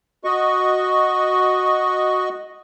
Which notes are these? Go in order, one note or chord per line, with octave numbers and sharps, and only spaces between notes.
F#4 D#5 C#6